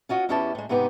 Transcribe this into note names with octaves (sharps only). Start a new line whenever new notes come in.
C#4 F4 F#4 D#5
E2 C#4 E4 G4 D#5 A5
A2 G#3
G#2 C3 B3 D#4 G4